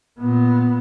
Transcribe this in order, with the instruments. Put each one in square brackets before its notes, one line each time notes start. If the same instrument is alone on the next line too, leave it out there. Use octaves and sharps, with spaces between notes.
[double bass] A#2 B3